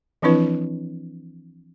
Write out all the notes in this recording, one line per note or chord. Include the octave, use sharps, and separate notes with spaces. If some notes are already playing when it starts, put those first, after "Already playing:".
E3 F3 C4 D4 E4 B4